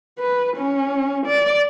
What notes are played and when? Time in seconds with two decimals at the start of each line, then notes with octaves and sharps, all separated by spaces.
0.20 B4
0.57 C#4
1.26 D5